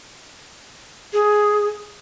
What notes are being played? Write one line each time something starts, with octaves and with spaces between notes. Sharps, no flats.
G#4